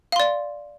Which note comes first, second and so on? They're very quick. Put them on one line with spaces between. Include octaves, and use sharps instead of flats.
F5 C6 D5